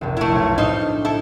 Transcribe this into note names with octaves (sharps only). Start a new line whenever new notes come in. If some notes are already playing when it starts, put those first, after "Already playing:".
F1 A#1
A3 E4
B1 C#5
A2 D4 D#4 C5 F6
E4 A4